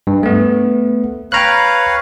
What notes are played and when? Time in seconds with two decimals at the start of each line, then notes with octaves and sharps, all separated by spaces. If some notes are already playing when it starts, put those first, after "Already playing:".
0.07 G2
0.23 A3 B3
1.32 B4 C#5 F5 G5 A#5 F#6